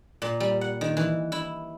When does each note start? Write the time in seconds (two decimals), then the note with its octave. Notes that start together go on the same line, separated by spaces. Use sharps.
0.22 A#2
0.40 G3
0.61 F#5
0.81 D#3
0.97 E3
1.32 E4